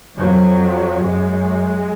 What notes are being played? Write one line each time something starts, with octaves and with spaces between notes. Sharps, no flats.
F2 F#3
F#2 G#3